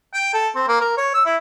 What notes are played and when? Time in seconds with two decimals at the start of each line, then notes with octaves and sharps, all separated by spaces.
0.13 G5
0.33 A4
0.55 C4
0.68 A#3
0.80 A#4
0.97 C#5
1.14 E6
1.25 E4